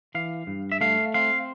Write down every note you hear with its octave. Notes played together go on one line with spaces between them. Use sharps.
E3 F5
G2
E5
A3 F5
C4 F5